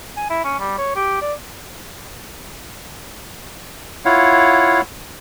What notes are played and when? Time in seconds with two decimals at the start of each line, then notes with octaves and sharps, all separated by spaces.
0.17 G#5
0.30 E4
0.44 C#4
0.60 G3
0.78 C#5
0.95 G4
1.21 D5
4.05 E4 F4 C#5 F5 F#5